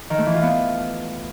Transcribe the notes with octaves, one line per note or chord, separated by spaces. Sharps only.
D#3
A3
E3
F4
B3